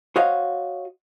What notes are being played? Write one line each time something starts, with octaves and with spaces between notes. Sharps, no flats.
F#4 C5 C#5 D#5 F5